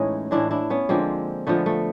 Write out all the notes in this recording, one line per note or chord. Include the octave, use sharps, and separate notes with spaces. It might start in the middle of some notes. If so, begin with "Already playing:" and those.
Already playing: A2 E3 G#3 C#4 D#4
A2 E3 G#3 D4 E4
D4 E4
B3 C#4
D3 F3 G#3 A#3 C4
D3 F3 G#3 A3 B3
A3